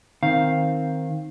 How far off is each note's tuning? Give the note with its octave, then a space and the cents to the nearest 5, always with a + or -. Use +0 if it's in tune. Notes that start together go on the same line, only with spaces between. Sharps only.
D#3 +0 C4 +5 F5 +0